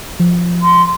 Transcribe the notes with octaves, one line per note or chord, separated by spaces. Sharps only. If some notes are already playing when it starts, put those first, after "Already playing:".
F3
C6